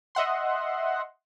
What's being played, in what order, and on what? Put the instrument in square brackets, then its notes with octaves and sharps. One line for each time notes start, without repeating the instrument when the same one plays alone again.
[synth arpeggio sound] D#5 E5 F#5 C6